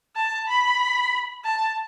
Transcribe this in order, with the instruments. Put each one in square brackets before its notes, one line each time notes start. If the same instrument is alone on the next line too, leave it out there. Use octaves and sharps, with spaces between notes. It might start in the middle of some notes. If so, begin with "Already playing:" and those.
[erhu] A5
B5
A5